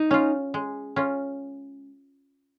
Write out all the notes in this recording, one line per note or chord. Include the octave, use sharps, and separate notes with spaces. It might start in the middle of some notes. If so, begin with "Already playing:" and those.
Already playing: D#4
C#4 F4
G#3
C#4 F4